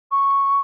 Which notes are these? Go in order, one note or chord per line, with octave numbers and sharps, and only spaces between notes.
C#6